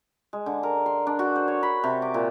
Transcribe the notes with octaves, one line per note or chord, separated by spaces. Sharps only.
G#3
D3
A#4
C6
D4
F#4
C5
C#5
B5
C3
D6
A#2